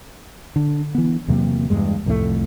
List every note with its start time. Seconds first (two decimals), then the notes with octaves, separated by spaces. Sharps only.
0.56 D3
0.95 E3 B3
1.28 E2 C3 F#3 A#3
1.70 E2 G2 G#3
2.06 C2 F2 A2 A3